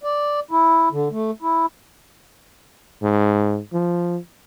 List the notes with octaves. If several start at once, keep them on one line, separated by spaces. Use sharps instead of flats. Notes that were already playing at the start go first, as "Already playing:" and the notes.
D5
E4
D3
A3
E4
G#2
F3